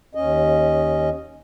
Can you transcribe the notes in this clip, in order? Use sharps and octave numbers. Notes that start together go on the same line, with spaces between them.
D#2 C#4 D#5